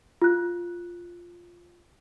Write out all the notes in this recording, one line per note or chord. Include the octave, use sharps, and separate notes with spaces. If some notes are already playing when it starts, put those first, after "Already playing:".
F4 F#6